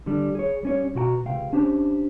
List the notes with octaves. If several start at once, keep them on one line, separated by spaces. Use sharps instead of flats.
D3 G3 D4
G#4 C#5
G3 C#4 C#5
B2 F#4 G5 A#5
C#2 C3 F5 G5
C#4 D4 G4 C5